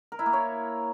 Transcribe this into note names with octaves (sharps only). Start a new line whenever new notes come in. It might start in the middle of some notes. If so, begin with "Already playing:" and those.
A#4
E4
A#3
C#5